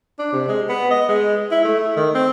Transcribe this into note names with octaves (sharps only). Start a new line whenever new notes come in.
D4
C3
G#3
B3
D#5
G#3
E4
A3
D#3
C4